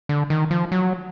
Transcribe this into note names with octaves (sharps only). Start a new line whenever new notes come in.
D3
D#3
F3
F#3